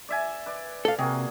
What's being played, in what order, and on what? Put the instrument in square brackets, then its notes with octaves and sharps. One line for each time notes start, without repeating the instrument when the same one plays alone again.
[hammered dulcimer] D5 E5 G#5
B4 D5
[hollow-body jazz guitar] A4 F5
[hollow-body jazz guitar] C3 [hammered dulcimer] A#3 F#4 G#4